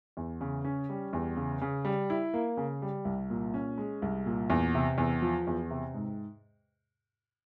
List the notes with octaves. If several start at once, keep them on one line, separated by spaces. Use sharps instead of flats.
E2
C#3
C#4
G3
E2
C#3
C#3
G3
E4
A#3
C#3
G3
C2
A#2
C#4
G#3
C2
A#2
E2
C3
E2
F3
E2
C3
G#2